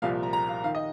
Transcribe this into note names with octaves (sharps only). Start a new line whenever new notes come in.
C2 A#2 F3 F5
A#5
A#5
F5
D#3 F5
D#5